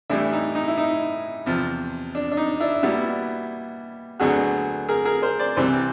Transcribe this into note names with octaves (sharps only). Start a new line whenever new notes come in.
A2 E3 G3 D4 E4
D#4
D#4
E4
D#4
E2 C3 F3
D4
D4
D#4
D4 E4
A#2 G3 B3 E4 F#4
D2 D3 F#3 B3 F#4 G#4
G#4 A#4
G#4 A#4
A#4 C5
C5 D5
C2 C3 E3 G3 C4 C5 D5